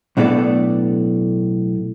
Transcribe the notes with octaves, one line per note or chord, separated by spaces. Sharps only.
B1 A2 B3 D4 A4 D5